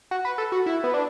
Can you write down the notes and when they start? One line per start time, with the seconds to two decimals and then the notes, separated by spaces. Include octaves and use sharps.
0.11 F#4
0.25 B4
0.38 A4
0.52 F#4
0.66 E4
0.84 B3
0.94 D4